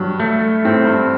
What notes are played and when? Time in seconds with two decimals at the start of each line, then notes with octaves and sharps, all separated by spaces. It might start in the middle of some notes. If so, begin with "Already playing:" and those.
Already playing: G2 F#3
0.20 A3
0.65 A2 C4
0.85 G2